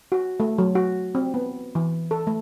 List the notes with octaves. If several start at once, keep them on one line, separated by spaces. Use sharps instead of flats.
F#4
A3
F#3
F#4
C4
B3
E3
A4
A3